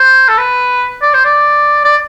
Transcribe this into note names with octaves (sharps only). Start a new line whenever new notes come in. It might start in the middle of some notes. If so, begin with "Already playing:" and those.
Already playing: C5
A4
B4
D5
C5
D5
D5